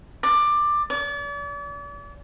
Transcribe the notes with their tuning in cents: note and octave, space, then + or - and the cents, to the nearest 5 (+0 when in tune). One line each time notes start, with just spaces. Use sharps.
D5 +15
D5 -40